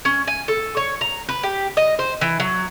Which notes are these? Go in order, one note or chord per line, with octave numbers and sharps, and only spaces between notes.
C#4
G#5
A4
C#5
A#5
B4
G4
D#5
C5
E3
F#3